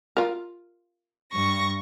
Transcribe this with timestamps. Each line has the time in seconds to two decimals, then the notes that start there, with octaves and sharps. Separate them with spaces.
0.17 F4 A#4
1.32 G2 C#6 A#6